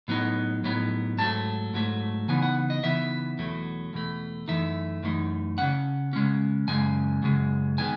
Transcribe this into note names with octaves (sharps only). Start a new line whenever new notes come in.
A2 F#3 B3 D#4
A2 F#3 B3 D#4
G#2 F#3 A3 A5
G#2 F#3 A3
C#3 E3 B3 D#4 G#5
F#5
D#5
C#3 E3 B3 D#4 E5
E2 B2 F#3 A3
E2 B2 A3
F#2 E3 A3 D#4 E5
F#2 E3 A3 D#4
C#3 G#3 C#4 F#5
C#3 G#3 C#4
F#2 C#3 G#3 G#5
F#2 C#3 G#3
D#3 G#3 B3 G#5